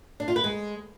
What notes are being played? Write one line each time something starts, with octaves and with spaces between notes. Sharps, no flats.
D4
F4
B4
G#3